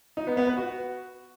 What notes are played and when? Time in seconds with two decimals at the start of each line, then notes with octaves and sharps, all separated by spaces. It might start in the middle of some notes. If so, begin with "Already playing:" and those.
0.17 D#4
0.27 B3
0.37 B3
0.47 B4
0.57 F#4